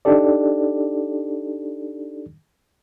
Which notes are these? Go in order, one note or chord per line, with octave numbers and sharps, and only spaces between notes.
D4 D#4 G4 A4 D5